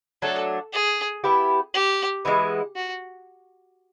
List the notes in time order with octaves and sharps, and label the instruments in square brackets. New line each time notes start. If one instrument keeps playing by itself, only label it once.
[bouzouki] F#3 A3 D4 [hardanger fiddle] A4
[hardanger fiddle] G#4
[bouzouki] B3 E4 G4
[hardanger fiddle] G4
[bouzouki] E3 G#3 B3 E4
[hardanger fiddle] F#4